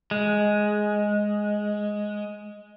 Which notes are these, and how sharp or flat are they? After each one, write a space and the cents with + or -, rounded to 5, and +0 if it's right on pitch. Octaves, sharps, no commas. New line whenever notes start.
G#3 +5